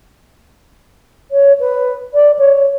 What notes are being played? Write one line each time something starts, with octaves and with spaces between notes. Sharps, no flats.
C#5
B4
D5
C#5